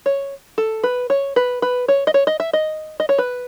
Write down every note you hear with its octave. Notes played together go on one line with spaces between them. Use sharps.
C#5
A4
B4
C#5
B4
B4
C#5
D#5
C#5
D#5
E5
D#5
D#5
C#5
B4